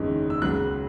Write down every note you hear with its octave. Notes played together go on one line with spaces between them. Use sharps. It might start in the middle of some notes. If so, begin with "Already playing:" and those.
Already playing: F#1 E2 D#3 G#3 C#4
E6
C#2 C#3 F#3 B3 F#6